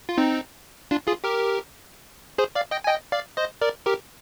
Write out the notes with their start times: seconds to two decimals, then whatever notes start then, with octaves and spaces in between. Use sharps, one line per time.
0.09 F4
0.18 C4 D#4
0.91 D4 F4
1.08 F4 G#4
1.24 G4 A#4
2.38 G#4 C5
2.55 D5 F5
2.71 D#5 G5
2.84 G#5
2.88 D#5 G5
3.12 D5 F5
3.37 C5 D#5
3.62 A#4 D5
3.86 G4 A#4